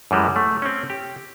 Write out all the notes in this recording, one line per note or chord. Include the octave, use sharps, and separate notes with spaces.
F#2 E3 G3 G#3
A3
C4 C#4
G4